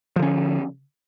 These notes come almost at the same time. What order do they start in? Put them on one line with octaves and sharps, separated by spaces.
F3 D3 C#4